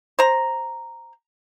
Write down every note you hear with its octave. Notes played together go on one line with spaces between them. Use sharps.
C5 A#5